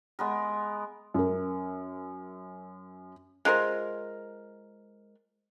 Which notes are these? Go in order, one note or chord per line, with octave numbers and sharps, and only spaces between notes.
G#3 B3 A#4
F#2 A#4
G#3 F4 A#4 C5